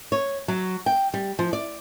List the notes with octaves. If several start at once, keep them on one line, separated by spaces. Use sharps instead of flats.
C#5
F#3
G5
G3
F3
D5